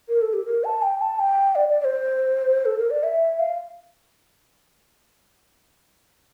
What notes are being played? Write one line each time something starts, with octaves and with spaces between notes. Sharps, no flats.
A#4
A4
G4
A#4
A5
G5
A5
G5
D5
D5
D5
C5
A4
A#4
D5
E5
F5